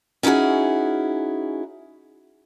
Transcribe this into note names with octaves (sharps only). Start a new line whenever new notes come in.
C#4 D#4 E4 F#4 G#4